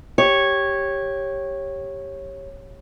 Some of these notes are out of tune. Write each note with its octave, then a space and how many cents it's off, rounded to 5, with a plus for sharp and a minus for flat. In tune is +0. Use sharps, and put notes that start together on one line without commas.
G4 +0 C#5 -10